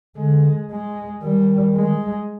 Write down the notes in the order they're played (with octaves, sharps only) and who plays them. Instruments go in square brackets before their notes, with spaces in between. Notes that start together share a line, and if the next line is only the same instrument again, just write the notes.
[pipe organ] D3 [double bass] G#3
[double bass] G#3
[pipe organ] D#3 [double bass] G3
[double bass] G#3